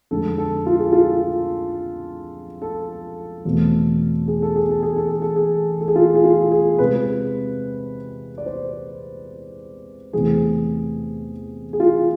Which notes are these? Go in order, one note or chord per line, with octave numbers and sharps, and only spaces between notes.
F2 D3 G#3 A4
A4
F4
G#4
F4
A4
E2 B2 A3 C4
G#4
A4
G#4
A4
G#4
A4
G#4
A4
G#4
A4
G#4
F4
G#4
F4
G#4
C3 G#3 C4 B4
D5
C5
E2 C3 E3 A3 C4 G#4
G#4
F4